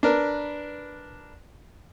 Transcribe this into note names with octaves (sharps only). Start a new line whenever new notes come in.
D4 A#4 B4